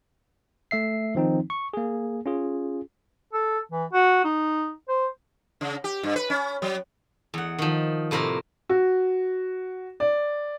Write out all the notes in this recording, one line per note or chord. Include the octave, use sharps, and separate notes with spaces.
A3 E5 C7
D#3 F3 C4 D#4
C#6
A#3 G#4
C#4 F4 G#4
A4
E3
F#4
D#4
C5
C#3
G4
G2
B4
C#4
F#3
E2 F#5
D#3 F3
A2 C3 A#3 C5 F5 A#5
F#4
D5